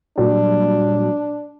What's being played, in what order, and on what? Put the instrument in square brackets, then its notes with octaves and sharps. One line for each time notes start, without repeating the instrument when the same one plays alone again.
[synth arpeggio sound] A#2 F#3 G3 [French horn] D4